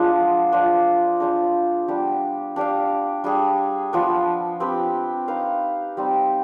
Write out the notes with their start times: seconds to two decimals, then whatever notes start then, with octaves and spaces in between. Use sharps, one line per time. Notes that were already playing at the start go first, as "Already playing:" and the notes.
Already playing: F3 G#3 B3 D4 F4 G#4 C5
0.52 D4 F4 C5 D#5
1.20 D4 G#4 C5 F5
1.88 G3 B3 D4 G4
2.56 D4 G4 D5 F5
3.24 G3 D4 G#4
3.93 F3 B3 D4
4.60 C4 G4 B4
5.28 D#4 B4 F5
5.97 G3 C4 D#4